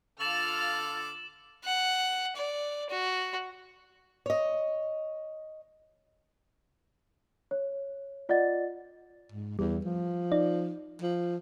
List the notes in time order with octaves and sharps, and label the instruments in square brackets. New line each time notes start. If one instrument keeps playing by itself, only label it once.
[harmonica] D3 D6 [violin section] F4 F6 [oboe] A4 [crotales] A6 E7 F#7
[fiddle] F#5
D5
F#4
[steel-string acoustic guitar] C#5 D#5
[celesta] C#5
F4 D5 D#5 F#5 A6
[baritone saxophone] G#2
[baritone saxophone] E2 [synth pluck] G3
[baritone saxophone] F3
[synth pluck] D#4 D5
[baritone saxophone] F3